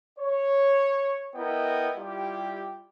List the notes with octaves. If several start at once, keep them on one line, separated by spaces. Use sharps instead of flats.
C#5
B3 E4 A#4 D#5 G5
G3 E4 F4 G4